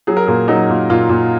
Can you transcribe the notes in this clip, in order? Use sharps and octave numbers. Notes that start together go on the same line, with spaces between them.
F#3 G#4
A#4
A#2 G#4
F#3 D#4
A#2
A#2 F4
A#2